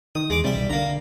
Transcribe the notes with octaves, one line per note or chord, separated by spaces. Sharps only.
D#3 D#6
E2 G#3 D6
C3 G3 E5
B1
D3 A#3 A#5